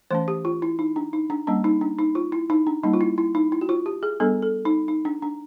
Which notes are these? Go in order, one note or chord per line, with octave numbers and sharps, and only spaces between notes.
E3 A3 C#4 C5
G4
F4
E4
D#4
D4
D#4
D4
G3 A#3 C#4 D4
D#4
D4
D#4
F4
E4
D#4
D4
G3 A#3 C#4 D#4
F4
E4
E4
D#4
E4
F#4
F4
G4
G#4
G3 B3 D4 A4
A4
D#4
D#4
D4
D4